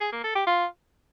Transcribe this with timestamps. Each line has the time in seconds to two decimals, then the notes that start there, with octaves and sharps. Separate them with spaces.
0.01 G#4
0.12 A#3
0.24 A4
0.35 G4
0.47 F4